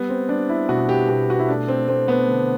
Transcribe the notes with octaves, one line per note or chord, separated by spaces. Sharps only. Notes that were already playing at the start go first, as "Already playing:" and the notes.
Already playing: G3 B3
C4
G3 D4
E4
B2 F#4
G4
B2 G4
F#4
E4
A3 D4
C4
A3 C4
B3
D3